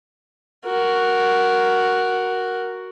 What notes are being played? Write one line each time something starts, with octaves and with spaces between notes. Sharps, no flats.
F#4 A#4